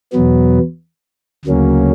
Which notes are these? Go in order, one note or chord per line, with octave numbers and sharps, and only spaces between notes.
E2 B2 F#3 B3
D2 C#3 F#3 A#3 C#4